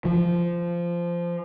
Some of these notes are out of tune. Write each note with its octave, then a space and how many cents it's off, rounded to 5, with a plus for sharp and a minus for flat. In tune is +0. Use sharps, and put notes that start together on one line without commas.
F3 -15